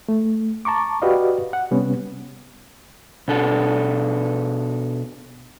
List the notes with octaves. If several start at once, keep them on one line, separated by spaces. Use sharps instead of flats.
A3
A5 A#5 C#6 D6
F#4 G4 B4 D5 D#5 F5
F#5
C3 G3 B3 C#4
B2 D4 A4